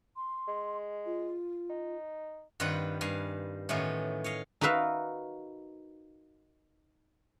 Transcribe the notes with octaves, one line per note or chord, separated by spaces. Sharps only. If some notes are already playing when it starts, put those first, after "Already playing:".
C6
G#3
F4
D#4
G2 D#3 C4 F4 B4 F#5
G2 F5 G#5
A2 D#3 E3 B3 C#4 F4
C#5 D#5 F5
D#4 F#4 A#4 B4 E5 F5